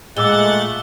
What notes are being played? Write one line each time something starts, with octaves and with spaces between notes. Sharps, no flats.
A#2 G#3 A3 F#5 D6 E6 A6 G7